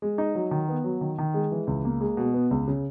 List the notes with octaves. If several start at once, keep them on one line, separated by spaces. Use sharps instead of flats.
G#3
D#4
F#3
D#3
B3
F#3
D#3
D#3
G#3
E3
C#2
A#3
G#3
B2
B3
C#2
C#3